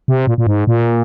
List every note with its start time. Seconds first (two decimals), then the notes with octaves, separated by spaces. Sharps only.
0.08 C3
0.27 A#2
0.38 A#2
0.47 G#2
0.67 A#2